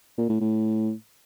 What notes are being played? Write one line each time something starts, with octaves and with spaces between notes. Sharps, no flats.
A#2
A2
A2